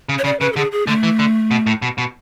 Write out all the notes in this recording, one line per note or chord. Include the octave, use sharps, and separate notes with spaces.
C#3
C#5
C#3 D5
C#3 B4
A4
D3 G#4
G#4
D3 A3
E3
D3
B2
A2
B2
B2